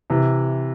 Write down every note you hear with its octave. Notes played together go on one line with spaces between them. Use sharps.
C3 E3